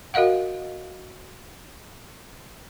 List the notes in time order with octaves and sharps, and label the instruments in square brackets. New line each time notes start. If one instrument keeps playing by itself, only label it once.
[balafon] F#4 A#4 D#5 F5 F#5